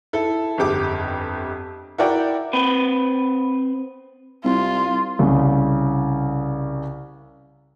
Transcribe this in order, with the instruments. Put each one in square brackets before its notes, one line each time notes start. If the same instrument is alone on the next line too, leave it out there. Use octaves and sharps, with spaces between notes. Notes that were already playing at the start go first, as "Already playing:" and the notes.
[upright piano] E4 A4
G1 F2 G4 D6
E4 F#4 A#4 D5 G5
[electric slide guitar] C4 B4
[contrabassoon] C2 [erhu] F4
[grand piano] C2 C#3